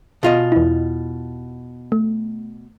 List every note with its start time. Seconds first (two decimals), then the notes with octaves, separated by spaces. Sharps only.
0.23 B2 F4 D#5
0.52 E2 E4
1.92 A3